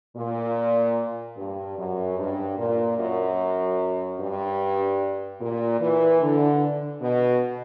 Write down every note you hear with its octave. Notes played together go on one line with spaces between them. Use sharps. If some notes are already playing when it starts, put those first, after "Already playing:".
A#2
G2
F#2
G2
A#2
F#2
G2
A#2
E3
D3
B2